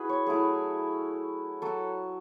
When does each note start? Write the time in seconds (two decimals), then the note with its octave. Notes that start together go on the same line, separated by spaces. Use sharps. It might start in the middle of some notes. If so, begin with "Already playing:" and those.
Already playing: E4 F#4 G#4 B4
0.09 C#5
0.26 F#3 A3 E4 G#4
1.62 F#3 A4